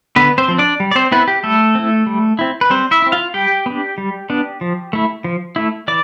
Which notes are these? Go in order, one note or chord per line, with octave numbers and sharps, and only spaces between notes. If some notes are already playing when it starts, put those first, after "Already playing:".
D3 B3 B4
C4 C5
F3 C4
D4 D5
G3
D5
C4 C5
B3 C4 E4 B4
G4
G3 A3 A4
C4 E4
G3
C4 E4
B4
G3 C4 C5
E4 E5
C4 E4
F4 F5
G3 G4 G5
B3 D4
G3
B3 D4
F3
A3 E4
F3
A3 E4
E3 D5 D6